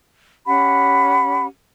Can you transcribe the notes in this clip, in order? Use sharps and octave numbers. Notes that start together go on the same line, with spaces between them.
C#4 G4 F#5 B5